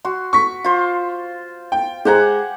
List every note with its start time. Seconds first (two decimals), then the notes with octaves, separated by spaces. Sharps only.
0.05 F#4 C6
0.33 C#6 B6
0.64 F4 C5
1.72 G5
2.05 G#3 G4 C5 F#5 G#5 A#5